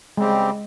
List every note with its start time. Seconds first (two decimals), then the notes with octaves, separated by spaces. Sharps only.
0.17 C#3 G3 G#3 C4 G4